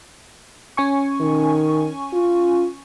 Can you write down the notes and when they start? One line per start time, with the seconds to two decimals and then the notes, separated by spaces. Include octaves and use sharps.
0.77 C#4 G#5 C#6
1.20 D#3
2.13 F4